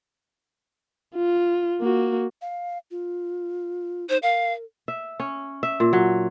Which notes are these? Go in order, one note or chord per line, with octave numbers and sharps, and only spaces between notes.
F4
A#3 F#4
F5
F4
D#4 C5
A#4 F5
E5
C#4
E5
A#2
F#3